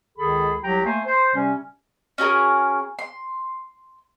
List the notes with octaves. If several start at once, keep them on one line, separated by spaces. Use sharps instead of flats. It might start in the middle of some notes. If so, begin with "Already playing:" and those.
C#2 D#3 G#4 A4 B5
C2 F#3 G4 G5 A#5
A3 A#3 C5 G#5
C5
C3 G3 C#4
C#4 F#4 G#4 A#4
C6